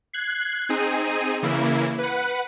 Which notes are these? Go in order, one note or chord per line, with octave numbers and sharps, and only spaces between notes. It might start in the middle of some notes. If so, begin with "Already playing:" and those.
F#6 G#6 C7
C4 D#4 G#4 D#7
C#3 E3 A#3 E4
B4 F#5